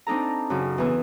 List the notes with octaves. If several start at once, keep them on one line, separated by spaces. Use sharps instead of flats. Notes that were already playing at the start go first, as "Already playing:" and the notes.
C4 D4 D#4 A4 A#5
F#2 C#3
E2 E3 B3